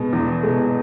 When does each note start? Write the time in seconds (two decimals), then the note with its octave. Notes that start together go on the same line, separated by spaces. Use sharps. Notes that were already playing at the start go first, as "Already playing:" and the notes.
Already playing: B2 G#3
0.13 E2
0.43 B2 G#3